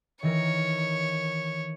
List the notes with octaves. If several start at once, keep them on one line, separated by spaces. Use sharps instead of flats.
D#3 E3 A#4 C#5